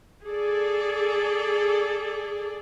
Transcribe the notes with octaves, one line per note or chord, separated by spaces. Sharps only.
G#4 A4 D5